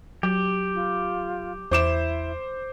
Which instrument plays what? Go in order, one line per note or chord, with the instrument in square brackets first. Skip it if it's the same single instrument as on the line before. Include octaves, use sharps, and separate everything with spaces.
[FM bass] F#3 [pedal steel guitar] G4
[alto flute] F4
[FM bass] E2 [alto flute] E4 [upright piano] C5 D6 E7